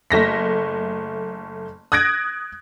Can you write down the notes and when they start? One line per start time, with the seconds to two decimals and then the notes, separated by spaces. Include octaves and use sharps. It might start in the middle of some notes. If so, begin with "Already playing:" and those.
0.11 F#1 A3 A#6 B6
1.92 D#6 F#6 G#6 A#6 D7